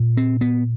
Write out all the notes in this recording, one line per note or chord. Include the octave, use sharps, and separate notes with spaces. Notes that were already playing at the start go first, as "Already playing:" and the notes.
Already playing: A#2
C4
B3